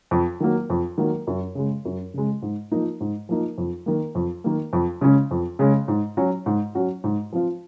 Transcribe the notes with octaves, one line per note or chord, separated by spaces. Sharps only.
F2
D#3 F#3 A#3
F2
D#3 F#3 A#3
F#2
C#3 G#3
F#2
C#3 G#3
G#2
F3 A#3 D#4
G#2
F3 A#3 D#4
F2
D#3 A#3
F2
D#3 A#3
F2
C#3 G#3 C#4
F2
C#3 G#3 C#4
G#2
F#3 C#4 F#4
G#2
F#3 C#4 F#4
G#2
F3 C4 F4